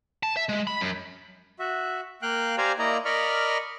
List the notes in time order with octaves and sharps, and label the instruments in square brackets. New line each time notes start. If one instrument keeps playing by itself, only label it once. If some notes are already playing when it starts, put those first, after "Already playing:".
[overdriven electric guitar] A5
E5
G#3
B5
F#2
[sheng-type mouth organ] F#4 E5
A#3 F5 G5 F#6
G4 C5 D5 F5 G#5 A#5
A#3 E4 D5 D#5 A#5
A#4 D5 D#5 B5 C#6 F6